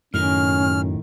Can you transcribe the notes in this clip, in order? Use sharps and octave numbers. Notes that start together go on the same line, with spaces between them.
F#2 A2 D#3 C#4 F6